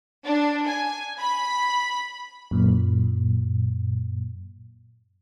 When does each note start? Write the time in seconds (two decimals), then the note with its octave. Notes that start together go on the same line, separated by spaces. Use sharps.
0.24 D4
0.65 G#5
1.19 B5
2.51 F#2 A#2